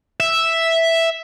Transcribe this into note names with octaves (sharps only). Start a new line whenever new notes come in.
E5